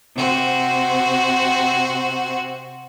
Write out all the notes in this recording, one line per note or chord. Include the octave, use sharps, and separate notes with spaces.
C3 F#4 C5